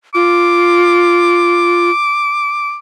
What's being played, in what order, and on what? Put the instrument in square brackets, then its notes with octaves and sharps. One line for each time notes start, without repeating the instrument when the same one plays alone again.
[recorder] F4 [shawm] D6